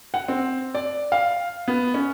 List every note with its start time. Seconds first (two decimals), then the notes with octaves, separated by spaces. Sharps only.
0.14 F#5
0.28 C4
0.75 D5
1.12 F5
1.68 B3
1.94 C#4